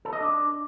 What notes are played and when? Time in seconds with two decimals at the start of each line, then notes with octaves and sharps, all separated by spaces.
0.05 A4
0.13 D#5
0.20 D4